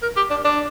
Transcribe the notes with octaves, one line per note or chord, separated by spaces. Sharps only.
A#4
G4
D4
D4